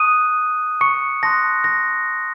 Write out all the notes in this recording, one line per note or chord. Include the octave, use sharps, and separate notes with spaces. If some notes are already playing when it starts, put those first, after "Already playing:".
Already playing: A5 C#6 D#6 F#6 D#7
C#6 C#7
A5 C6 D#6 F#6 A#6
A#6